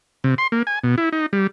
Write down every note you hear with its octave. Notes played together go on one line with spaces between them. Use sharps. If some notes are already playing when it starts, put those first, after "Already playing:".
C3
C6
A#3
G#5
B2
E4
D#4
G3